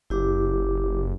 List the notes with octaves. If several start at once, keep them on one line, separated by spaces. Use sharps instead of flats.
F#1 E4 G4 D6